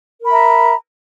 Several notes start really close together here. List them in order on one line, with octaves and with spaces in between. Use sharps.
A#4 B5 E5 A#5